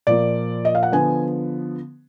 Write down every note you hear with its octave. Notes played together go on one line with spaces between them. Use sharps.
A#2 F3 A#3 D5
D#5
F5
F#5
D3 F3 B3 G#5